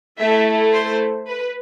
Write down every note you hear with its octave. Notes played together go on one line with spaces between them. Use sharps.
A3 E4 A4 E5
C5
B4